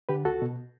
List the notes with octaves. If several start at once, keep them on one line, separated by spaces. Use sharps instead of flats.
D3 G4 B4
C#2 F#4 A4
B2